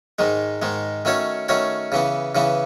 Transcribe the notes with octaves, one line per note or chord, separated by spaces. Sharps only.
G#2 D#3 G#3
G#2 D#3 G#3
D#3 A3 C#4 F#4 C#5
D#3 A3 C#4 F#4 C#5
C#3 E3 B3
C#3 E3 B3